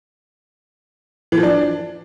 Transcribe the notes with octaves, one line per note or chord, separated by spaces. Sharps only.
E3
F3
D4